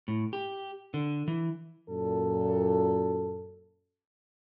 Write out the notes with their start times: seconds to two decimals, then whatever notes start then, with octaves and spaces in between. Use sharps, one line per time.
0.08 A2
0.33 G4
0.94 D3
1.28 E3
1.89 F#2 A#2 A4